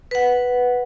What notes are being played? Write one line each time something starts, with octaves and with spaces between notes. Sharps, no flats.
B4 F#5